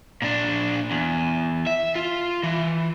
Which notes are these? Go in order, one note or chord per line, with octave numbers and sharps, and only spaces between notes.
A#2 D4
E2
E5
F4
E3